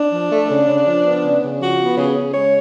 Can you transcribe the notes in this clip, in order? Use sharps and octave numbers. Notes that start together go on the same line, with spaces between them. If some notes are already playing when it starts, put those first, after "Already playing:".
Already playing: D4
F3
A3
C#3
C#3
F3
B3
C#3
C#3
F3 F#4
B3
C#3 G#4
C#3
G#3 C#5